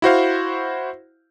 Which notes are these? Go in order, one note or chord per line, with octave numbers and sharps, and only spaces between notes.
E4 F#4 C5 F5